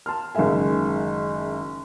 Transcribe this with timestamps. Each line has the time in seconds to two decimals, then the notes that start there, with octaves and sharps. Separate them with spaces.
0.06 A5 C6 F6
0.35 F#1 D#3 G#3 A#4 E5 G#5